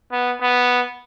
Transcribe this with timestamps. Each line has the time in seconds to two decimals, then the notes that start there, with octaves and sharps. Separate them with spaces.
0.12 B3
0.41 B3